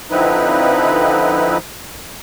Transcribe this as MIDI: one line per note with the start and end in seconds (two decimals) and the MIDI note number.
0.11 1.57 50
0.11 1.57 53
0.11 1.57 60
0.11 1.57 63
0.11 1.57 64
0.11 1.57 71